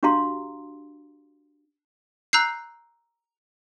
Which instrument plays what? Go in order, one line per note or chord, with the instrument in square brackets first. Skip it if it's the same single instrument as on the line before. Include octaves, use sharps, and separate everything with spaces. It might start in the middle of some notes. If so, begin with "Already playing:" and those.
[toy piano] D4 F#4 G4 F5 A#5 C6
[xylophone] A#5 E6 F#6 G6 C7